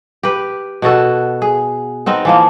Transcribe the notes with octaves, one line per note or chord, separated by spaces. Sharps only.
G4 B4
B2 B3 F#4 A4
G#4
B3 C4 D#4 A#4
E3 F3 A#3